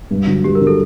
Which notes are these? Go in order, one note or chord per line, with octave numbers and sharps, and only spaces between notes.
G2
D3 F#3
G2 G4
A#4
D3 F#3
A4